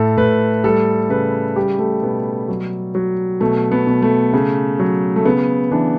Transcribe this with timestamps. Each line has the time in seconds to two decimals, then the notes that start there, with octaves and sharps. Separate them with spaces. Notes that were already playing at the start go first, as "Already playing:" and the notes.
Already playing: A2 A4
0.17 A2 B4
0.64 G3 A4
1.10 C#3 B4
1.56 G3 G4
1.79 A3
2.02 B2 B3
2.48 F#3
2.95 F#3
3.41 B2 A3
3.72 B3
3.87 B2
4.02 A3
4.33 C#3
4.80 F#3
5.16 A3
5.25 C#3 B3
5.71 E3 D4